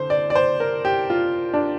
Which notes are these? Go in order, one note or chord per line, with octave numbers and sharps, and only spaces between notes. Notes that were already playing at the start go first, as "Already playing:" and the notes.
Already playing: D3 C5
D5
D5
C5
A#4
G4
F4
D4